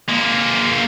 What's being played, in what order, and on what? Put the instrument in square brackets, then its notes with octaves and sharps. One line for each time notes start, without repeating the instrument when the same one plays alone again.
[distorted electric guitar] G#3 A#3